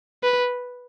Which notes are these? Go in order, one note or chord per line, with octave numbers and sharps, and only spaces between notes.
B4